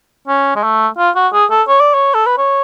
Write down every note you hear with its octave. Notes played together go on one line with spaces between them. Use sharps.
C#4
G#3
A3
F4
F#4
G#4
A4
C#5
D5
C#5
A4
B4
C#5